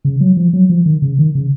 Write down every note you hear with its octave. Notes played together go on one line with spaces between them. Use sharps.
C#3
F#3
F3
F#3
F3
D#3
C#3
D#3
C#3